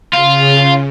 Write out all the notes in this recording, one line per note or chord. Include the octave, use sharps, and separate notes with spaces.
C#3 F4